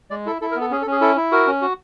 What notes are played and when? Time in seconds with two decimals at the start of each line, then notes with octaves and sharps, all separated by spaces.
0.10 G#3 D5
0.26 E4 A4
0.41 E4 A4
0.51 A#4
0.56 B3
0.61 A4
0.71 C#4 G#4
0.82 A4
0.87 C#4
0.92 G#4
1.01 E4 A4
1.16 E4
1.32 F#4 A#4
1.47 C#4
1.62 F#4